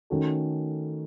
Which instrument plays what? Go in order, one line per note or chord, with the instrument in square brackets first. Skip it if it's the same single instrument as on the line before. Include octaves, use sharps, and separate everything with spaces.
[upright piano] D#3 A3 C#4 F#4 A4